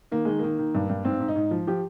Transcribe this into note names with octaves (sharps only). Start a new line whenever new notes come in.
D#3 A#3
D#3 G#3
D#3 A#3
D#3
G2
G2
G#2 C4
G#2
D#4
G#2
F3
F3 G4